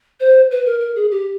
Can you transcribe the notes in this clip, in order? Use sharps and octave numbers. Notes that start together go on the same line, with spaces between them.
C5
B4
A#4
A#4
G#4
G4